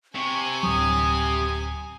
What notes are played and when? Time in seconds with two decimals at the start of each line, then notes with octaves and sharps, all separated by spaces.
0.15 C3 G#5 C#6
0.63 D1 F#3 D#6